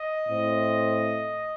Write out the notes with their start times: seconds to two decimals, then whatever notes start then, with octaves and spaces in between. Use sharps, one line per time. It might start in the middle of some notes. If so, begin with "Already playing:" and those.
Already playing: D#5
0.28 A2 A3 C4